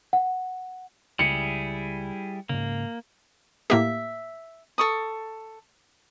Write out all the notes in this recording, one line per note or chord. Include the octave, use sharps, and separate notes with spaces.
F#5
C#2 G3 E4 G#4 C#7
G#2 C#3 A#3
A2 A#3 G4 E5
A4 C#6 D#6